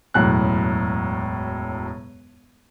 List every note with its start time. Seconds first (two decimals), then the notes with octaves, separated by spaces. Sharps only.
0.14 E1 F#2 A2 F#6